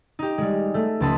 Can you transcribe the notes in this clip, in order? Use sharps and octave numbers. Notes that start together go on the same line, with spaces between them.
D#4 G4
G3 G#3
A3
C#2 F3 A5 B5 D#6